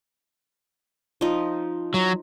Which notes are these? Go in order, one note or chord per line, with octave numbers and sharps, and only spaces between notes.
F3 D#4
F#3